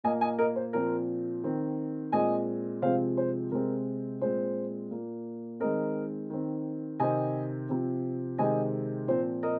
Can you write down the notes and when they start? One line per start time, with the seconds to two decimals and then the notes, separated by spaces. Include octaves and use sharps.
0.04 A#2 A#3 D#5 G#5
0.21 D#5 G#5
0.39 A#4 D#5
0.56 C5
0.73 A#2 F3 C4 A#4
1.44 D#3 C4
2.12 A#2 G#3 C4 D#5 G#5
2.82 C3 F3 G#3 C4 C5 F5
3.17 C5
3.51 C3 G#3 C4 A#4
4.21 A#2 G#3 C4 C5
4.91 A#2 A#3
5.60 D#3 G#3 C4 A#4 D#5
6.30 D#3 C4
7.00 C3 D#3 C4 D#5 G#5
7.69 C3 F3 C4
8.38 C3 D#3 G#3 C4 D#5 G#5
9.08 A#2 F3 C4 C5
9.43 A#4 D#5